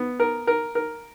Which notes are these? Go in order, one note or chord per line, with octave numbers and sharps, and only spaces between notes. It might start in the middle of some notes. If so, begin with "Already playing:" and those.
Already playing: B3
A#4
A#4
A#4